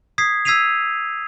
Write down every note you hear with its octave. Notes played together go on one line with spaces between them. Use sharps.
D#6 G#6 B6 C7
E6 G#6 B6 C7 D#7 F7